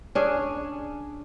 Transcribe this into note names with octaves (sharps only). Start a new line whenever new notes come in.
C#4 D4 G#4